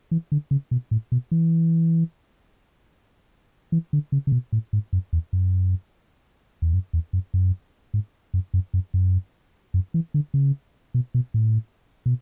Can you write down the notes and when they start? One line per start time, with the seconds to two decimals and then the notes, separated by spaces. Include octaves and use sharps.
0.11 E3
0.32 D3
0.51 C#3
0.71 B2
0.91 A2
1.12 B2
1.31 E3
3.72 E3
3.93 D3
4.12 C#3
4.27 C#3
4.32 B2
4.52 A2
4.73 G#2
4.93 F#2
5.13 E2
5.33 F#2
6.62 E2
6.73 F#2
6.93 E2
7.13 F#2
7.34 F#2
7.94 G#2
8.34 F#2
8.54 F#2
8.74 F#2
8.94 F#2
9.74 F#2
9.94 E3
10.14 D3
10.34 C#3
10.94 B2
11.14 B2
11.34 A2
12.06 B2